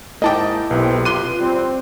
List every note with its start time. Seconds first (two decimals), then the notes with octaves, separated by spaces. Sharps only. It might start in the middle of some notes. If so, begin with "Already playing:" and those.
0.22 G#2 A#3 E4 D#5 G5 A5 D6
0.71 B1 C3 B4
1.05 F4 C6 D6 F#6 D#7
1.40 G3 C4